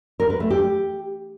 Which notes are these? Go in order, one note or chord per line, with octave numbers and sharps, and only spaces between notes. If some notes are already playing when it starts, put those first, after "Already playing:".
A#4
B4
A3
G4